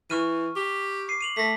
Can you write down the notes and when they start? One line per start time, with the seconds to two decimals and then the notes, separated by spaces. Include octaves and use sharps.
0.10 E3 C#6 F6 D#7
0.56 G4
1.08 D6 C7 D#7
1.21 D#7 F7 F#7
1.37 A3 A#6 B6